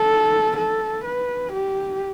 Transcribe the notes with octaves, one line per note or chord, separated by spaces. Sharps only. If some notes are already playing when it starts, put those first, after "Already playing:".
Already playing: A4
A4
B4
G4